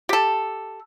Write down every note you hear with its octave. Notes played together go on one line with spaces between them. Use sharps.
G4 A4